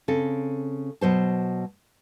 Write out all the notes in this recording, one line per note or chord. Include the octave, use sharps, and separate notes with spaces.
C#3 C4 A4
B2 F#3 C5 A5